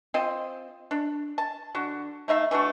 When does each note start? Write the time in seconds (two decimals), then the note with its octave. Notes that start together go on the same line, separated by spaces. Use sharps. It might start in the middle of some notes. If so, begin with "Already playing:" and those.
0.14 C4 F4 C5 D#5
0.91 D4
1.38 A5
1.75 D3 F#4
2.28 A3 D#4 E5 F5
2.51 E3 A3 D4 F#4